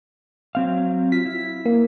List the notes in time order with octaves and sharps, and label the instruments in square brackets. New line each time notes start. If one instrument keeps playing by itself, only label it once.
[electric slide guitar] F#3 C4 F5
[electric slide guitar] F4 [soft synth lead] B6
[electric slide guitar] E4
[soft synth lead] A#3